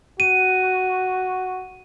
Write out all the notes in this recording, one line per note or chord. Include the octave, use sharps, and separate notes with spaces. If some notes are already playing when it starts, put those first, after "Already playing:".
F#4 D#7